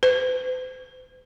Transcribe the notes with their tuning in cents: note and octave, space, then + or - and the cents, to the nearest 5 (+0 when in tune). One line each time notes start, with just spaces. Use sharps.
C5 -45